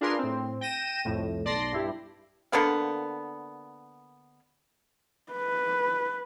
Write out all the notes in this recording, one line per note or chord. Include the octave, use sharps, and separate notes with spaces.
D4 F4 G#4 A#4 B4 C6
A2 C4
G5 A#6 D#7 E7
C2 F2 A2
B1 D5 A5 C6 A#6
G2 E4 G4
D3 A#3 B3 F5
B4